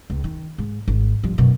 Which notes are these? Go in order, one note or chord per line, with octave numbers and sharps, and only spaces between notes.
C#2
D#3
G#2
G#1
G2 F3
F#2 B2